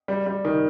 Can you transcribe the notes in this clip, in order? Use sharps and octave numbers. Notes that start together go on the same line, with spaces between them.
G3
G3
D#3